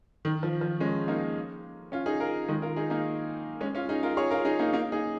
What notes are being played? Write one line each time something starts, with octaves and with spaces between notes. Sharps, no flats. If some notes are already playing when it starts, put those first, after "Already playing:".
D#3
F3
F3
G#3 C#4
A#3 D#4
C#4 F4
D#4 G#4
F4 A#4
D#3 G#3
F4 A#4
D#4 G#4
A#3 D#4
G#3 C#4
C#4 F4
D#4 G#4
F4 A#4
G#4 C#5
F4 A#4
D#4 G#4
A#3 D#4
A#3 D#4
D#4 G#4